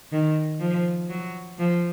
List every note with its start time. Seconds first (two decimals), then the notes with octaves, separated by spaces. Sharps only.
0.12 D#3
0.60 F3
1.09 F#3
1.59 F3